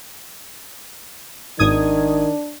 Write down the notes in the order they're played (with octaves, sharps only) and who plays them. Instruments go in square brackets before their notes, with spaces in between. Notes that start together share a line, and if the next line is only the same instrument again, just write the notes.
[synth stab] G#1 D#6 G#6 [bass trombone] D#3 [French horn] D4